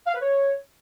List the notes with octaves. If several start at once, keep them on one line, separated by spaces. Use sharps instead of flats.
F5
B4
C#5